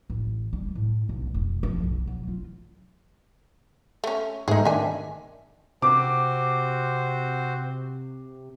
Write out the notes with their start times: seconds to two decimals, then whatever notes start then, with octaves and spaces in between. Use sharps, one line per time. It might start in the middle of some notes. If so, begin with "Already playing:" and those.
0.10 A1
0.53 G3
0.75 A2
1.09 B1
1.34 F1
1.63 F2
1.84 B1
2.07 F#3
2.28 F4
4.04 A3 C#4
4.48 G#2 A3 D#4 G#4
4.65 D#3 D4 E5 G#5
5.82 C3 C4 F#4 C5 D6